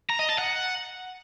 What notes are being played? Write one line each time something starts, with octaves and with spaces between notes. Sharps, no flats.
A#5
D#5
A5
F#5